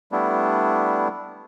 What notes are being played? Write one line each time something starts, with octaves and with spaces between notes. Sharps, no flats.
G3 A3 B3 D4 E4